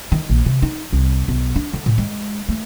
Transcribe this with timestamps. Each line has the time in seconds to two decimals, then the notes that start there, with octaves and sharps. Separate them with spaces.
0.12 D#3
0.29 A#1
0.46 C3
0.62 D#4
0.92 C2
1.28 B1
1.56 D4
1.73 D3
1.86 A2
1.98 G#3
2.49 A3